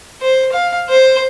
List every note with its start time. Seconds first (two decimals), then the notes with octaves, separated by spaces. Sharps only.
0.21 C5
0.52 F5
0.89 C5